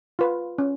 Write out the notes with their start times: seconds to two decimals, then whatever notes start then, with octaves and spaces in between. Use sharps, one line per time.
0.19 F4 B4
0.58 C#4